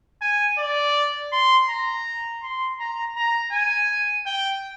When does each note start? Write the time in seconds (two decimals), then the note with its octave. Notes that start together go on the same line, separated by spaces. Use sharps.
0.22 G#5
0.58 D5
1.32 C6
1.69 A#5
2.42 C6
2.79 A#5
3.16 A#5
3.52 G#5
4.26 G5